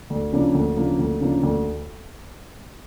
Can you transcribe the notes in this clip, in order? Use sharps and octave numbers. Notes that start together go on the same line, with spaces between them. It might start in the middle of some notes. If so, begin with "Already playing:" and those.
D2
C#3 F3 A#3 D4
D2
C#3 F3 A#3 D4
D2
C#3 F3 A#3 D4
D2